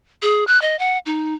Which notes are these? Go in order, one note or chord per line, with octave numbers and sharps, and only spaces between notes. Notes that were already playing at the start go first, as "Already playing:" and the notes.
G#4
F#6
D#5
F#5
D#4